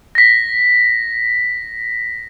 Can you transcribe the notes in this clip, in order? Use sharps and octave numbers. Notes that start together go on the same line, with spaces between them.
A#6 B6